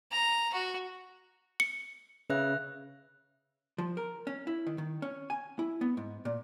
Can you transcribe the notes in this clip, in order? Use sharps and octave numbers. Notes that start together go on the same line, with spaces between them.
A#5
F#4
C#7
C#3 B4 E5 F#6
F3
A#4
C#4
E4
D#3
D#3
C#4
G#5
E4
B3
G#2
A#2